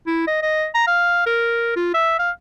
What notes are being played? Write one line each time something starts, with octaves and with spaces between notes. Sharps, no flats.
E4
D#5
D#5
A#5
F5
A#4
F4
E5
F5